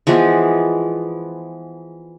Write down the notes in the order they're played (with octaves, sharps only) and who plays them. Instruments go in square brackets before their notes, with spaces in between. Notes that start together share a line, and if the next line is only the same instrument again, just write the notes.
[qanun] E3 F3 G#3 B3